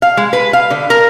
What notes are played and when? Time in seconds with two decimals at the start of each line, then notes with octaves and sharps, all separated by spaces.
0.02 F5
0.17 G#3
0.33 B4
0.53 F5
0.70 D3
0.90 A#4